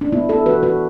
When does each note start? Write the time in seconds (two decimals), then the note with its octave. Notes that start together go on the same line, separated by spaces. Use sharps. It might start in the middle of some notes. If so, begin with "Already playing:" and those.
0.01 D4
0.12 B3 E4
0.29 E4 A4
0.46 E3 F#4 B4
0.63 F#4 B4